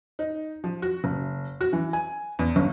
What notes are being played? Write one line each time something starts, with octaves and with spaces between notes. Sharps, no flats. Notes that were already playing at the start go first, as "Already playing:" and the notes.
D#4
F3
F#4
F#1
F#4
E3
G#5
E2
G1